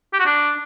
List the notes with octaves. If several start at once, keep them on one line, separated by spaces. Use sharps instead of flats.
G4
F#4
D4